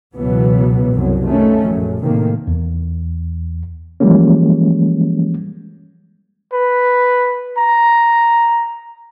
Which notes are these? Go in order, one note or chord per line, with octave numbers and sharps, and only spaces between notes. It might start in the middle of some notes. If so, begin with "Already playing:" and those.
C#2 B2 E3 F#3 B3
C2 F#2 F#3
D#3 A3 C#4
A#1 F#2
A2 C3 D#3 A#3
E2
E3 F3 G3 G#3 A#3 C#4
B4
A#5